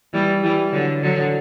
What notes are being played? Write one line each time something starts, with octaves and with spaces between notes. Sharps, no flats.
E3 G3
E3 G3
D3 F#3
D3 F#3